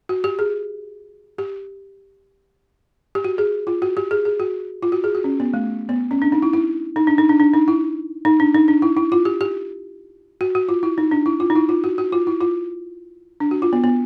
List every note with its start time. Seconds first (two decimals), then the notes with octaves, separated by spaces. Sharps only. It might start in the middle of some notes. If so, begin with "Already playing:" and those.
0.09 F#4
0.24 G4
0.39 G#4
1.38 G4
3.15 G4
3.24 F#4
3.38 G#4
3.67 F4
3.82 F#4
3.97 G4
4.11 G#4
4.25 G#4
4.40 F#4
4.83 F4
4.92 F#4
5.04 G#4
5.15 F#4
5.24 C#4
5.40 B3
5.54 A3
5.89 B3
6.11 C#4
6.22 D4
6.32 D#4
6.42 E4
6.53 E4
6.96 D#4
7.07 D4
7.18 D#4
7.29 D4
7.40 D4
7.54 D#4
7.68 E4
8.25 D#4
8.40 D4
8.54 D#4
8.68 D4
8.82 E4
8.97 E4
9.12 F4
9.25 G4
9.41 G4
10.41 F#4
10.55 F#4
10.69 F4
10.83 E4
10.98 D#4
11.11 D4
11.26 E4
11.40 F4
11.50 D#4
11.56 E4
11.69 F4
11.84 F#4
11.98 F#4
12.12 F4
12.27 E4
12.41 F4
13.40 D4
13.51 F#4
13.62 F4
13.73 B3
13.84 B3